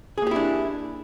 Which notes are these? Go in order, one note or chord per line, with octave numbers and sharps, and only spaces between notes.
A#3 D4 E4 G4 G#4